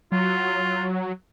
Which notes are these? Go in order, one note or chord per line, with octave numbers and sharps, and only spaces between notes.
F#3 F4